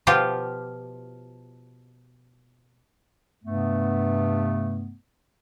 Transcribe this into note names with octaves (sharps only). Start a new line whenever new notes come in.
B2 F3 F4 G4
G2 C3 A3 B3